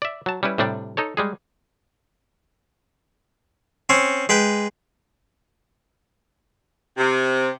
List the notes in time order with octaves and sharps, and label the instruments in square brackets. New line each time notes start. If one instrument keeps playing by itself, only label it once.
[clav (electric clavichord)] D5 E5
F#3 A5
G3 C#4 E4 B4
A2 C3 G3 D4 D5
D#4 A4 C#5
G3 G#3 G#4
[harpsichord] C4 C#4 C#5
G#3 B4 G5
[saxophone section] C3